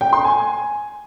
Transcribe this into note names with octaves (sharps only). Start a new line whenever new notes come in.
G5
C6
G#5